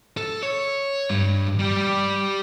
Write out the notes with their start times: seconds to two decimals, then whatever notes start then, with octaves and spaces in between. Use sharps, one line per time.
0.17 A4
0.43 C#5
1.10 G2
1.59 G3 G4